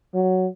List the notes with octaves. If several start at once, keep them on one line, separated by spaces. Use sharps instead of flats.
F#3